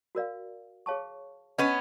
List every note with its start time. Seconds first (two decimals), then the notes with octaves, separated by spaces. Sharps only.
0.15 F#4 A#4 D5 F5
0.86 G#4 C#5 F5 A5 C#6
1.58 B3 C#4 B4 D#5 G#5 C#6